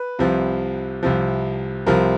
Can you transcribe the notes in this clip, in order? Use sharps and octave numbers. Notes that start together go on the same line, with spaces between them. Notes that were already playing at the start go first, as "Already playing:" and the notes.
Already playing: B4
C2 C3 F3
C2 C3 F3
C2 C3 F3 A#4